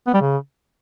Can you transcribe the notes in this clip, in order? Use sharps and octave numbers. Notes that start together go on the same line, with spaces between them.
B3
G3
C#3